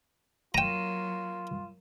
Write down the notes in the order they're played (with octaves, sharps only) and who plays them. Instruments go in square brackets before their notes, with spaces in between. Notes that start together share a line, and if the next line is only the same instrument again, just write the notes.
[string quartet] F#3 A#3 [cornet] F4 [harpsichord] G5 A#5 [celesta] D#7 E7